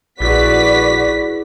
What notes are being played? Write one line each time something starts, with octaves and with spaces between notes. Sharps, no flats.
A#1 E4 F#4 G#4 B4 D5 B6